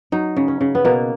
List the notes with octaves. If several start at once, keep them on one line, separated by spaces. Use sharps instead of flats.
F#3 D#4
C#3
C#4
C#3
B3
B2 A#3